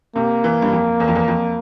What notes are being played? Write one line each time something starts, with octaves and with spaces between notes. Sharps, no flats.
C3 A#3
E3
G2
F2
E2
F2
E2
F2